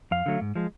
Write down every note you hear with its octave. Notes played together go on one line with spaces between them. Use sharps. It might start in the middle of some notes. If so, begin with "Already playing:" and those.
F2 F5
D3 F#3 A3
G#2
F3 G#3